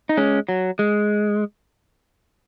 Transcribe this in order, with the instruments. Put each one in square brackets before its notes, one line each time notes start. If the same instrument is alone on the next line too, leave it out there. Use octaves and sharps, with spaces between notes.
[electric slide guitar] D#4
G#3 C#4
F#3
G#3